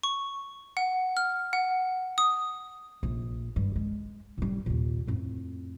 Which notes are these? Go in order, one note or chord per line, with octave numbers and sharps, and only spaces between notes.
C#6
F#5
F6
F#5
D#6
A#1
G2
G#3
A2 G3
D#2 A#2
F2 A2